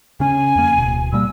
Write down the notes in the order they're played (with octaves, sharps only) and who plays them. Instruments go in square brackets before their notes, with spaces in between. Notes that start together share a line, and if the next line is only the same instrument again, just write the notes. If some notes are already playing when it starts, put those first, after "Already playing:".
[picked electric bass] C#3 C#4 [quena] G#5
[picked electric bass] F2 A#3
D1 B2
[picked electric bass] B2 G3 A#3 [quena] E6